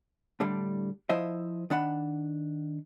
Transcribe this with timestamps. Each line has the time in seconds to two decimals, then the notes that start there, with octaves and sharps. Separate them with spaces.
0.40 A2 D3 G3 D4
1.09 F3 E4 C5 D#5 E5
1.70 D#3 D4 F#5 B5